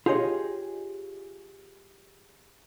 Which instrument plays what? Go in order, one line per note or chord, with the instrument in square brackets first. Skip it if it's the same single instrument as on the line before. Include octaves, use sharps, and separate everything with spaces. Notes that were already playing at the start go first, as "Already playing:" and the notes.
[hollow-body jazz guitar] F4 G4 G#4 C#5 D#5